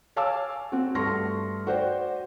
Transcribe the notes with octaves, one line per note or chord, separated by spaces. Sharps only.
C#5 F5 G#5 A5 D6 E6
C4 F#4
G2 A3 C6 C#6 F6 A#6
F#4 C5 D5 G5